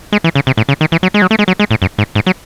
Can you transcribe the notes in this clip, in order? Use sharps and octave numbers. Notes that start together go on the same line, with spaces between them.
G#3
E3
C#3
C3
A2
C#3
D#3
E3
F#3
G#3
F#3
A3
G#3
F#3
G#3
A2
F#2
G#2
G#2
F#3